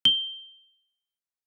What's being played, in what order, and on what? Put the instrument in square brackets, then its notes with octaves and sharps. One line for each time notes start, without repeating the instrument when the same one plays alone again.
[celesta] G7